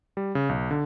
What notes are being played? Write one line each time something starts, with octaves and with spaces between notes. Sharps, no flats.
G3
C#3
B1
D3